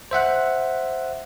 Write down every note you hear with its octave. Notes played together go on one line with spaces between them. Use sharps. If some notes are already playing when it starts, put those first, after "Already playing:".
C5 E5 F#5 F#6